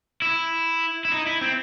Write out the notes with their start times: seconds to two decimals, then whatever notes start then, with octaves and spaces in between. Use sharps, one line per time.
0.22 E4
1.05 E4
1.12 D#4
1.27 E4
1.41 C4